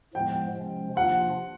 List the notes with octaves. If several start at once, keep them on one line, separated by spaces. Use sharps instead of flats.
A2 F3 G#3 B3 G5
C3 F3 G#3 C#4
C3 F3 A#3 D4 F4 F#5